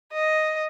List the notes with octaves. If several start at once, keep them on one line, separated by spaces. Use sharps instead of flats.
D#5